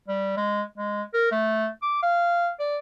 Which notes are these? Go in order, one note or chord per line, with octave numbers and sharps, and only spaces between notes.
G3
G#3
G#3
A#4
A3
D6
F5
D5